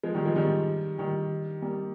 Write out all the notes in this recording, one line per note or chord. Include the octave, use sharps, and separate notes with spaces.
F3 G#3
D#3 G3
F3 G#3
D#3 G3
D#3 G3
G3 A#3